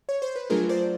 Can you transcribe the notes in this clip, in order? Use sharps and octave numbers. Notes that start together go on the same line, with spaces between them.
C#5
C5
B4
F#3 A3 D4 F4 G#4 A#4
C5 D5